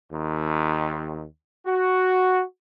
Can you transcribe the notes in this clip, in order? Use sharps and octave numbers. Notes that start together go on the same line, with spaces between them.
D#2
F#4